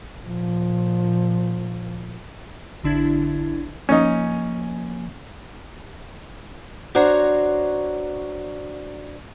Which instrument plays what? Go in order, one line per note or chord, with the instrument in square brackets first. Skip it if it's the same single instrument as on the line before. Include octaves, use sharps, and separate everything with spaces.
[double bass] A#2 F3
[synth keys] A1 D3 D4 E4 G#6
[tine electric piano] F3 A#3 G#5 [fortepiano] C#4 D#4
[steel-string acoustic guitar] D4 F#4 C5 C#5 A#5